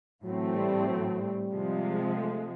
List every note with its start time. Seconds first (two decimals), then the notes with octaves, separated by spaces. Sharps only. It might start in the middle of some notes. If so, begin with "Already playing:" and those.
0.24 A2 E3 F#3 A3 C4
0.56 G3
0.88 F#3
1.20 G3
1.51 C3 F3 G#3
2.16 A3